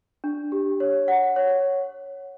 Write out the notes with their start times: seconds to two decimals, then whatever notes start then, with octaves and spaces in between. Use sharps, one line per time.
0.24 D4
0.52 G4
0.80 C#5
1.08 F#5
1.36 C#5